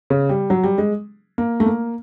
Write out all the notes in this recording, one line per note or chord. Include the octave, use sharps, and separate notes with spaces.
C#3
G3
F#3
G3
G#3
A#3
A3
A#3